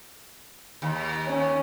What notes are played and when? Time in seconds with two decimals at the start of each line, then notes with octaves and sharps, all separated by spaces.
0.82 D#2
1.27 C#4